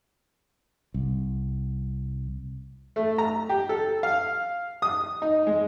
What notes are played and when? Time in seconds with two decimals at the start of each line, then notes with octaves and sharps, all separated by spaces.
0.94 C2
2.96 A3
3.18 A#5
3.49 G4
3.69 A4
4.03 F5
4.82 D#6
5.22 D#4
5.47 G#3